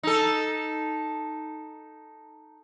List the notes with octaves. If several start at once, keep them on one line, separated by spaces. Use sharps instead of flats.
D#4 A4